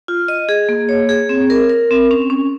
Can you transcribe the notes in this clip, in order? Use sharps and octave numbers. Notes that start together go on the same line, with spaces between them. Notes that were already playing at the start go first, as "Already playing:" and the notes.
F4
D#5
G#4
A#3
C#5
G#4
C4
A#4
A#4
C4
C#4
C#4